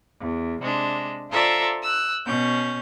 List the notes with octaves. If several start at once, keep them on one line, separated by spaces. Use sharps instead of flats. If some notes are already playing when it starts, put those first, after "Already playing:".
E2
C3 G#3 D4
F4 A4 C5 D5 E5 A#5
E6 F#6
B2 C#4 G6